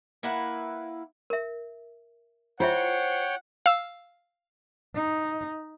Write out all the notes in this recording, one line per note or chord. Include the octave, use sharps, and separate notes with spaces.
A#3 E4 B4 F#5
A#4 E5
E4 F4 C5 C#5 E5 F#5 G5
F5 E6
D#4